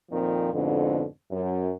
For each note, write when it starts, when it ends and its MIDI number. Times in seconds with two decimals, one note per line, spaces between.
0.10 0.50 41
0.10 0.50 46
0.10 0.50 51
0.10 0.50 53
0.10 0.50 60
0.53 1.05 41
0.53 1.05 44
0.53 1.05 47
0.53 1.05 50
1.30 1.71 42